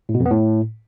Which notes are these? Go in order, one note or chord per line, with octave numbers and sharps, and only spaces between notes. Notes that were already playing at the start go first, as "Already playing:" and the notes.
A2
B2
F2
B3
A2